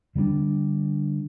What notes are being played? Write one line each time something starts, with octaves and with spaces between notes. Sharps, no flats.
D3 G3 B3 D4